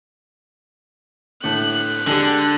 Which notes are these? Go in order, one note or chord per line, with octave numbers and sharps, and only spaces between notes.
A2 D3 A3 F#6
D3 G#3 D4 G4